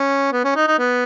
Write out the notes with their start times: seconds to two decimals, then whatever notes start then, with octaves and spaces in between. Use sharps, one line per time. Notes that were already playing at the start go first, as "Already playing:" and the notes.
Already playing: C#4
0.33 B3
0.44 C#4
0.56 D#4
0.67 D#4
0.79 B3